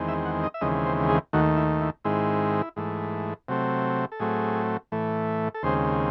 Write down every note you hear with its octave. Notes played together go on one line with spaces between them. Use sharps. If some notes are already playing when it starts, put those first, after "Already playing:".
Already playing: E2 D#3 G#3 C4
E5
F#5
D#5
E5
D#2 C#3 E3 G#3 C4 D#5
C5
G#4
D#2 D#3 A3 F#4
E4
E4
G#2 D#3 G#3 C4 E4
G#2 E3 A3
C3 F#3 A3 C4
A4
A2 F#3 A3 C4 G#4
A2 E3 A3
A4
D#2 C#3 G#3 C4 C5